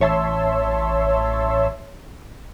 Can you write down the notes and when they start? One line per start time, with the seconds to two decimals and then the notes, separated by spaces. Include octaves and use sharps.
0.01 A1 C#5 E5 A5 C6 E6